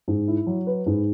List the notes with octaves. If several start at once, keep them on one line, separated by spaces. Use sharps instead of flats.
G#2
E4
F#3
B4
G#2